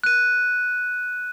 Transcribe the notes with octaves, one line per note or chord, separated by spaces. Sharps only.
F#6 D#7